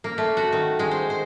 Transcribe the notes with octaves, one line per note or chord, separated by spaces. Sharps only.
A#3
A3
F#4
D#3
G#3
C5
C5